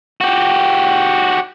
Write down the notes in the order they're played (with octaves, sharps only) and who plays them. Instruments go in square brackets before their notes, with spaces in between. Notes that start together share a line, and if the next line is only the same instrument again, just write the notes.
[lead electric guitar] F#4 G4